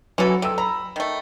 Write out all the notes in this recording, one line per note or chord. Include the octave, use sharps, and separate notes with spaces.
E3 F#3 C#4 A4
C3 A4 E6
A#5 B5
D#3 A3